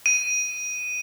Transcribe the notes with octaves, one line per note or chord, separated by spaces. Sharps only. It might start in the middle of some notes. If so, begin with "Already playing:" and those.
D#7